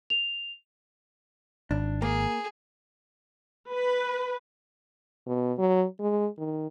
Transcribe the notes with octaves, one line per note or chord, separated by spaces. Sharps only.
F7
G#1 D4
A#3 G#4
B4
B2
F#3
G#3
D#3